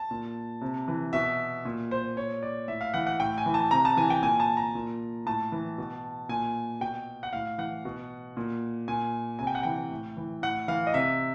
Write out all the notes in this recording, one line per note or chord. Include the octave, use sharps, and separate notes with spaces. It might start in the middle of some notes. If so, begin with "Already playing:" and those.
Already playing: A5
A#2
C3
E3
B2 E5
A#2
C5
A#2 C#5
D5
A2 E5
F5
E3 F#5
F#5
A2 G5
G#5
E3
A5
C3 A#5
A5
E3 G#5
G5
A#2 G#5
A5
A#5
A#2
A2 A5
E3
B2
A#2 G#5
B2 G5
F#5
A2 F5
E3 F#5
B2
A#2
A#2 G#5
C3 G#5
G5
F#5
E3 G5
A2
E3
A2 F#5
E3 F5
D#5
C3 E5